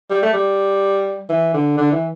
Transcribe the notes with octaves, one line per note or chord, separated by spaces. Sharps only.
G3
A3
G3
E3
D3
D3
E3